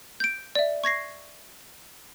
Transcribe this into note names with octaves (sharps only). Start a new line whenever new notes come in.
G6 D7
D5 E5
C#6 G#6 A#6 C7